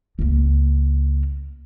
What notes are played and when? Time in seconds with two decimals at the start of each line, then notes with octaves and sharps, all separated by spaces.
0.19 C#2 A#3